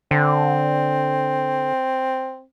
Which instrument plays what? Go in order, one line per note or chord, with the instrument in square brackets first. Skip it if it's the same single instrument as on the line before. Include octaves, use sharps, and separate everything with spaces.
[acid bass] D3 [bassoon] C4